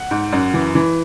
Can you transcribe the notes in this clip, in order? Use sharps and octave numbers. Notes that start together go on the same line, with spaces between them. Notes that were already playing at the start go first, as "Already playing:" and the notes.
Already playing: F#5
G#2
F#2
E3
E3